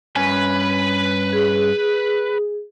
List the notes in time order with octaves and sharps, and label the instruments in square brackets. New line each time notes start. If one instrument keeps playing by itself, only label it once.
[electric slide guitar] G2 C#4 G#5 [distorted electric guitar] B4
[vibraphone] G#4